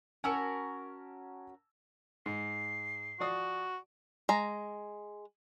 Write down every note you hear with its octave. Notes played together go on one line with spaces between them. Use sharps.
C#4 F#4 A#4 G#5 A5 E6
G#2 C7
F3 F#4 D5 D#6
G#3 A#5